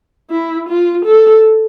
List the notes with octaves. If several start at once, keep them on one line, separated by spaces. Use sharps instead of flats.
E4
F4
A4